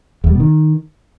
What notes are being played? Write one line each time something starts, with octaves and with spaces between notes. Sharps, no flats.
E2
G3
B2
D#3